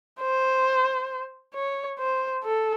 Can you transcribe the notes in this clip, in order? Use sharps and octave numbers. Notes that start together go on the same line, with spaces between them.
C5
C#5
C5
A4